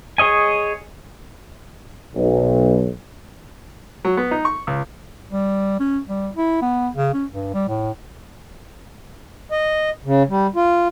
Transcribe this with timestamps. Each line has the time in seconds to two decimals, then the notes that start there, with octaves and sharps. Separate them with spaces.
0.18 G#4 C#5 D#5 G#5
2.16 B1
4.05 F#3
4.17 B3
4.31 D#4
4.45 C#6
4.67 C#2
5.32 G3
5.80 C#4
6.08 G3
6.36 E4
6.62 B3
6.96 C#3
7.14 C#4
7.32 G2
7.54 G3
7.69 A2
9.52 D#5
10.05 C#3
10.30 G3
10.56 F4